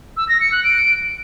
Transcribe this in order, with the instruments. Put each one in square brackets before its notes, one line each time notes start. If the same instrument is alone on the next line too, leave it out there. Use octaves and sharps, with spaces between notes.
[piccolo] E6
A#6
C#7
F#6
D7